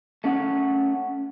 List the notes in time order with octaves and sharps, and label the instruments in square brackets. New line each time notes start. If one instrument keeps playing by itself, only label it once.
[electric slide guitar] A3 C#4 F#5